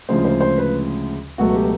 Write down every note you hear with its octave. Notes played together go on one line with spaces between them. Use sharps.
D2 C#3 F3 G#3 C5
C5
C5
B4
C#2 B2 F#3 A3 F#4
G4